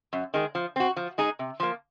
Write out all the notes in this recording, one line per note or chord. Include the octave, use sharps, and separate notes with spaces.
F#2
D#3 G#3
F3
C4 F#4
F3
G#3 D#4 G#4
C3
F3 A#3